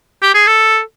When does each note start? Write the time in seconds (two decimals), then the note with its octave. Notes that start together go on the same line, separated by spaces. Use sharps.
0.22 G4
0.34 G#4
0.47 A4